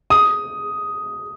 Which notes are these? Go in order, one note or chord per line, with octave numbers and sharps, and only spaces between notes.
D#6